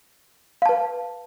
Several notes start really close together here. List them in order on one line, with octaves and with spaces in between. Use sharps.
F5 A5 B4